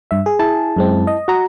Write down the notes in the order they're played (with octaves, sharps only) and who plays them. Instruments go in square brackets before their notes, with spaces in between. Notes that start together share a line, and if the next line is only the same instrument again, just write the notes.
[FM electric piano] G2 E5
G#4
[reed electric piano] E4 A5
[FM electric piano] F#2 G#3 C4
D#5
[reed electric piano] F#4 A#5